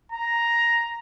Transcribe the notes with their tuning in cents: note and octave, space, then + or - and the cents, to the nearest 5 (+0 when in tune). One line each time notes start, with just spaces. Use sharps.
A#5 +5